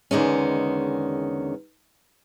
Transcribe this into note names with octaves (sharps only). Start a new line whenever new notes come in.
E2 D3 D#3 G#3 C#4